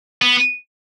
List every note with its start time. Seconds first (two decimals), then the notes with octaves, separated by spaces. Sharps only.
0.22 B3